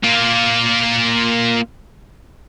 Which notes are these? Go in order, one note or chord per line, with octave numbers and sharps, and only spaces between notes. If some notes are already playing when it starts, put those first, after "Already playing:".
A#3 F4